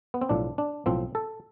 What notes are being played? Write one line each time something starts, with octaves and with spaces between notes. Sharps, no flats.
B3
C4
B1 A2 F3 D4
D4
B1 A2 F3 C4
A4